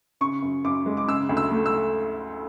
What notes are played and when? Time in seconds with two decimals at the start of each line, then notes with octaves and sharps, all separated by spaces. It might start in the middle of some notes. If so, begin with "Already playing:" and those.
0.21 C#3 C#6
0.42 F#2
0.64 F#2 D6
0.86 G#3
0.97 D6
1.08 C#3 E6
1.29 D2
1.37 E6
1.51 A3
1.66 E6